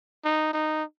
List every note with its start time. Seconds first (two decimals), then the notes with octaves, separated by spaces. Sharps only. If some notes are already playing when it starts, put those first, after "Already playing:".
0.25 D#4
0.53 D#4